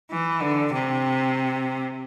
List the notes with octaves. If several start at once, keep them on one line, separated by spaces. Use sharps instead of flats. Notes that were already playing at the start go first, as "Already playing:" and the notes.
E3
D3
C3